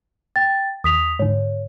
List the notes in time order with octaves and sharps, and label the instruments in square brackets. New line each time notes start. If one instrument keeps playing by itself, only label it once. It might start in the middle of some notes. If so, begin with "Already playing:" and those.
[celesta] G5 A6
[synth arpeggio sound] D#2 [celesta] D#6 B6 F7
[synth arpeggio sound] G#2 D3 [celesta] C#5